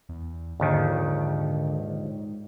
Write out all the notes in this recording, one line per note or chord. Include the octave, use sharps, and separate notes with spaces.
E2
A#1 D#2 G#2 D3 D#3